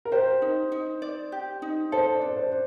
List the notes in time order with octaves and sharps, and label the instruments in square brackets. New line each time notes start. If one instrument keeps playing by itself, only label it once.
[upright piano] A#4
[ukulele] G4 [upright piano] C5
[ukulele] D#4
D#4
D5
G4
D#4
[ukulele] A4 [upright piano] C5
[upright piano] D5
[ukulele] D4
[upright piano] C5
[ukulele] D4